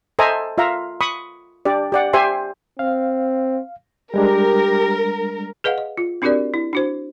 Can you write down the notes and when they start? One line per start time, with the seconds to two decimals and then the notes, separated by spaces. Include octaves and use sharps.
0.19 A4 C5 D#5 E5 G#5 A#5
0.58 F4 E5 F5 A#5
1.01 B5 C#6 D#6
1.65 D4 G4 D5
1.92 G4 D5 F#5
2.13 G4 C5 E5 G#5 C6
2.79 C4 F5
4.14 G3 G#3 D4 G4 A#4
5.64 G#4 B4 D#5 F5 F#5
5.78 D#5
5.97 F4
6.22 C4 D4 F#4 G4 A#4 D5
6.54 E4
6.73 D4 F#4 C5